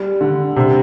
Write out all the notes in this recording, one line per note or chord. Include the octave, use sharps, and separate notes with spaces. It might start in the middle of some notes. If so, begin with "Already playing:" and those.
Already playing: G3
D3
C3